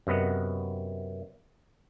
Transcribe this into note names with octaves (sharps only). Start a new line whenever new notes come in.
F#2 C3 B3 D#5 F#5